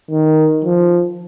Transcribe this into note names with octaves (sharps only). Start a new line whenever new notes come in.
D#3
F3